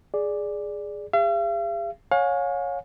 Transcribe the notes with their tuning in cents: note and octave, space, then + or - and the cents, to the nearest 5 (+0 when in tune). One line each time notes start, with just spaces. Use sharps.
G#4 +0 D5 +0
G#4 -45 F5 -45
C#5 +0 F5 +40 G#5 +0